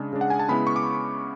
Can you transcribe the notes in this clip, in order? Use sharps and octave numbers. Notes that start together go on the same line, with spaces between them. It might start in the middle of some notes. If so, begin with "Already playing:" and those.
Already playing: C#3 G#3 D4
C#3 G#3 D4
F#5
G#5
A5
C#3 G#3 B3 E4 B5
C#6
D6